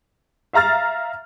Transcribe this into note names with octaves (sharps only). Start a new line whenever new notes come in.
E5 F5 A#5 F6 A6